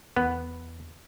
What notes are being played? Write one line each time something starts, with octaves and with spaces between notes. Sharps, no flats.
E2 B3